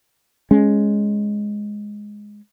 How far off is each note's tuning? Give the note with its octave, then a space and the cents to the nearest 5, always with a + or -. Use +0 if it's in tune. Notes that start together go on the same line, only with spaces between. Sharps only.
G#3 +0 C#4 +0